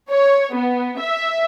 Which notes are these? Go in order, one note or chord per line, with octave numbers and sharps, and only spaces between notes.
C#5
B3
E5